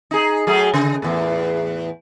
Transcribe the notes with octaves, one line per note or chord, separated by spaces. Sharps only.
D#4 G#4
F#3 A3 G#4
C#3
E2 A2